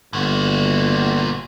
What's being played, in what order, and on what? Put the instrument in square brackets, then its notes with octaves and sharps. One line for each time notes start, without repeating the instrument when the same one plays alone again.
[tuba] G1 [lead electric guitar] A#2 F#4